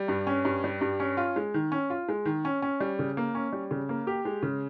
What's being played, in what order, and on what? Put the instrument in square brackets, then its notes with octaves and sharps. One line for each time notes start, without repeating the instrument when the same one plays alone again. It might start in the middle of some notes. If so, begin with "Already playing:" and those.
Already playing: [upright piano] G3
G2
C#4
G2
G3
G2
C#4
F4
G#3
D#3
C#4
F4
G#3
D#3
C#4
C#4
G3
C#3
A#3
C#4
G3
C#3
A#3
G4
G#3
C#3